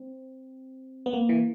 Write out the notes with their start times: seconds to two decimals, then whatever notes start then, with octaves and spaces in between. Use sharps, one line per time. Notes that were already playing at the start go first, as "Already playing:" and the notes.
Already playing: C4
1.06 B3
1.13 A#3
1.29 E3